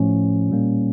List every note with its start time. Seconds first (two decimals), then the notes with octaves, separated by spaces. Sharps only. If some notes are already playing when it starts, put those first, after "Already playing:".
Already playing: A2 F3 A3 C#4
0.49 A#2 G3 A#3